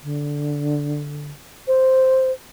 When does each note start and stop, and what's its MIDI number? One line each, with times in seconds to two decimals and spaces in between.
0.04 1.30 50
1.68 2.32 72